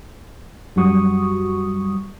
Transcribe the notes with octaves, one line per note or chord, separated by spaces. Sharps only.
F#2 G3 F#4 C#6 D#6